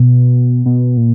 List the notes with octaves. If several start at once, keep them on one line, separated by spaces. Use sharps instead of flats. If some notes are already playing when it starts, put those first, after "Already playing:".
Already playing: B2
B2
A#2